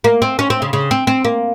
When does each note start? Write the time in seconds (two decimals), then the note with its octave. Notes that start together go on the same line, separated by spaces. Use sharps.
0.04 A#3
0.22 C4
0.39 C#4
0.50 C4
0.62 C#3
0.73 C#3
0.91 C4
1.07 C4
1.25 A#3